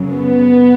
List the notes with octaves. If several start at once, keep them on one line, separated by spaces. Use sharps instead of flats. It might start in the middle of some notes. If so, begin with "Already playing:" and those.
Already playing: F#2 C#3 F#3
B3